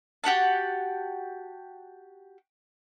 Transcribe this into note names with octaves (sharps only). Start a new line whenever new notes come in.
F#4 G4 F#5 A5